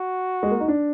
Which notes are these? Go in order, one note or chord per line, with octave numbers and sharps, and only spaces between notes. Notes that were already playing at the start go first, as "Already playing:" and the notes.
Already playing: F#4
G#3
A#3
D#4
D4